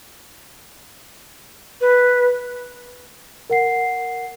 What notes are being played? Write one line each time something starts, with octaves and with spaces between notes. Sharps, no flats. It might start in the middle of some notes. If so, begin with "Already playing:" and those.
B4
A#4 F#5 C7